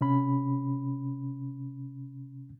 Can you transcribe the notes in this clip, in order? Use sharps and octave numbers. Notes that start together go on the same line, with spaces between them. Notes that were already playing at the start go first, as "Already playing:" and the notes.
C3 C#4 B5